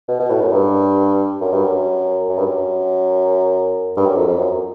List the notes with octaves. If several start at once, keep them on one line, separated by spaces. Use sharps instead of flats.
B2
B2
A2
F#2
G2
F#2
G2
F#2
F#2
G2
F#2
G2
F#2
F2
F2
F#2